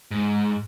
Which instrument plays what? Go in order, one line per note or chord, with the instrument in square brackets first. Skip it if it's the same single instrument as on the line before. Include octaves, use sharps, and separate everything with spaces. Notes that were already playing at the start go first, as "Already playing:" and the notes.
[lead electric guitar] G#2